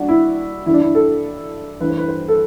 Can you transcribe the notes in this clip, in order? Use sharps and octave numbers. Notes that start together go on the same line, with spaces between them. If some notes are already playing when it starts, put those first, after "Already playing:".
Already playing: G3 D4 F#4
E4
A1 G2 D3 E4
D4
E4
A4
A1 G2 E3 G3 B4
C5
B4
C5
A4